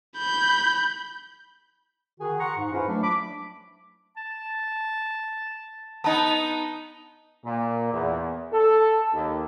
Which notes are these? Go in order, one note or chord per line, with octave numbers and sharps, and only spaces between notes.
B5 G6
D#3 F#4 G#4
F#5 A#5 C6 C#6
G#2
C#4 E4 F4 G#4 B4 C5
F#3 A3 D4
B5 D6
A5
B3 D#4 A5
A#2
E2
A4
D#2